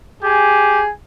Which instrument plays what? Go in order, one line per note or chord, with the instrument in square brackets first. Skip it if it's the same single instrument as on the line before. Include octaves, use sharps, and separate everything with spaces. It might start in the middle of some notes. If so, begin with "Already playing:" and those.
[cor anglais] G4 [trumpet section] G#4 G#5